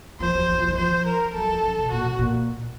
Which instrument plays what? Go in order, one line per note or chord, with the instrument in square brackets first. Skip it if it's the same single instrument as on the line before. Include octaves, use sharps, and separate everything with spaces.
[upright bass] F3 [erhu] C5
[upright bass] F#3
F#3
F3
D#3
[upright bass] F3 [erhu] C5
[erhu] A#4
[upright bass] F#3 [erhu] A4
[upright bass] F3
C#3
C3
[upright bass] A#2 [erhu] F#4
[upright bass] C3
A#2